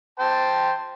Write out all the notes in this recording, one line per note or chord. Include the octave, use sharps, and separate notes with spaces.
C5 G5 A5